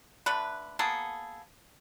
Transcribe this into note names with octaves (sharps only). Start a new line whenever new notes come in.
D3 A3 B4
A#3 B3 G#4 A4